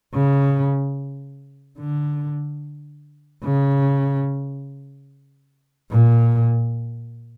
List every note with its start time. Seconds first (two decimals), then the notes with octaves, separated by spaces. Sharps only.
0.14 C#3
1.79 D3
3.44 C#3
5.91 A#2